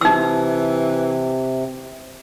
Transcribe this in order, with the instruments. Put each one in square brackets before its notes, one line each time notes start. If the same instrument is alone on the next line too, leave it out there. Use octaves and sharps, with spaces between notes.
[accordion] C3 [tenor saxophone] E3 [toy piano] D#4 E6